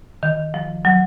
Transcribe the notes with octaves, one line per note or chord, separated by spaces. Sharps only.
D#3
F3
F#3